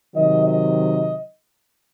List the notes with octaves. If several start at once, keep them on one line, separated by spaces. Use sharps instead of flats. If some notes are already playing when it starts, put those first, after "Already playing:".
C3 D#3 F#3 D#5
D#5